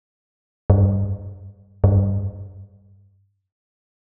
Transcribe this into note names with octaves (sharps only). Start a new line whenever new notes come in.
G2
G2